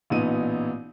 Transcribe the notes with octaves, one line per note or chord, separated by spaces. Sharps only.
A1 A#2 B3 D#4 D#7